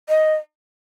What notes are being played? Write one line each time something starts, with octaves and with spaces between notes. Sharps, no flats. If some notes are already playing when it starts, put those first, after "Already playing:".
D#5